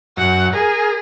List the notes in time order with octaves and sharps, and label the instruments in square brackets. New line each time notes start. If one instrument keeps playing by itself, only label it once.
[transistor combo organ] F#2 [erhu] F#5
[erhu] G#4 [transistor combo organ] A#4